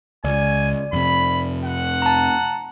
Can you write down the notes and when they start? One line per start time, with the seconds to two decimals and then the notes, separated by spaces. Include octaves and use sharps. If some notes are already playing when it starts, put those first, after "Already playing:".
0.24 C#2 D5 G#5
0.93 F2 C3 B5
1.65 F#5
2.02 A5 A#5